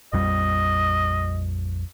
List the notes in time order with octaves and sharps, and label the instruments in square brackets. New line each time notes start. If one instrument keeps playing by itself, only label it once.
[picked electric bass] A#1 F2 G3 [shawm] D#5